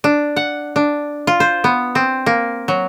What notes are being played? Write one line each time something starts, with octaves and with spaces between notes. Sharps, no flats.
D4
F#5
D4
F4
C5
B3
C4
A#3
F#3